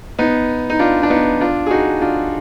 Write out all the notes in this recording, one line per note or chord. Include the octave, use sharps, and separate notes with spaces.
B3 D#4
D#4
D4 F4
D4
B3 D#4
D4 F4
G#4
D#4 F#4
D4 F4